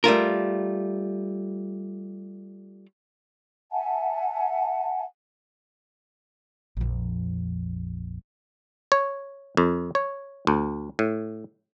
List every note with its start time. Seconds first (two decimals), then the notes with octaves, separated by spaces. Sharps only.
0.04 G3 A3 F4 A#4
3.70 E5 F#5 G#5 A5
6.77 A#1 F2
8.92 C#5
9.57 F2
9.95 C#5
10.47 D2
10.99 A2